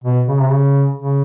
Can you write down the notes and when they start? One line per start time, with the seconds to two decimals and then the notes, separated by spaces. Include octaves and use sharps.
0.04 B2
0.27 C#3
0.40 C3
0.51 C#3
0.98 C#3